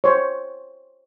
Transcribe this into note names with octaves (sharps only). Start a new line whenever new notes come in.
C5 C#5